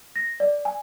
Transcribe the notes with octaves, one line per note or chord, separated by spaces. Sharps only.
A#6
D5
G#5